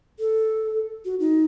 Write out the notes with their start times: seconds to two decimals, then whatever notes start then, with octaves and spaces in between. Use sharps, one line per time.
0.19 A4
1.05 F#4
1.20 D#4